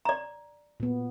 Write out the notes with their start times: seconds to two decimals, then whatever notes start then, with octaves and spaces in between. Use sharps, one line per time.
0.05 D5 A#5
0.80 A#2 B3